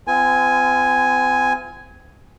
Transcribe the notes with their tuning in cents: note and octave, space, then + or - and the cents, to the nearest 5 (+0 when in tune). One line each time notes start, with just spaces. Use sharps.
C4 -40 F4 -30 G#5 +0